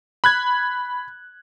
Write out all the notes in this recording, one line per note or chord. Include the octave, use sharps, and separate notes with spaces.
B5 F#6 G#6